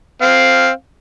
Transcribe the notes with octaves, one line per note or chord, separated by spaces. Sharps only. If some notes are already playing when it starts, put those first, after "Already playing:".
C4 F5